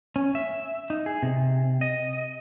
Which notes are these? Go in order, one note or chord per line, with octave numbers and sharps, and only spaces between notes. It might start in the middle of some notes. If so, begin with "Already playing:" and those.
C#4
E5
D#4
G#4
C3
D#5